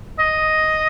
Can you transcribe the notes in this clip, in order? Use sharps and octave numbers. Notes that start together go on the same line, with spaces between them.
D#5